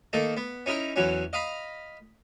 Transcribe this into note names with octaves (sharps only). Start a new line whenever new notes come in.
D#3 A#3 D#4 A4
B3
C#4 D#4 E4 A#4
E2 E3 F#3 C#4
D#5 F5 A#5 B5